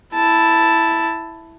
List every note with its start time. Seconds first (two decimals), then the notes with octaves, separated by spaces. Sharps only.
0.14 E4 A5